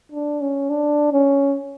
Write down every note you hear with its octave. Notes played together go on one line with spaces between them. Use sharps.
D4
C#4
D4
C#4